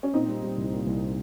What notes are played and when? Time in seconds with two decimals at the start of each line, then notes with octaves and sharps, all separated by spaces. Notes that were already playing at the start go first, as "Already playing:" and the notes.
0.03 C#4
0.13 A#2 C4 D#4
0.28 G3
0.43 G3
0.58 C2
0.72 A#2
0.87 C2